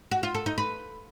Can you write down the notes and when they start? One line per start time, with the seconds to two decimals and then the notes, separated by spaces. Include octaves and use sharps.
0.11 F#4
0.23 F4
0.35 A4
0.46 D#4
0.58 B4